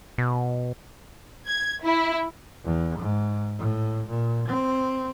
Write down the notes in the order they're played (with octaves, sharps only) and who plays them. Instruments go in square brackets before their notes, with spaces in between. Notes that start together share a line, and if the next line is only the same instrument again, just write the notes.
[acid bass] B2
[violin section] G#6
E4
[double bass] E2
G#2
A2
A#2
C4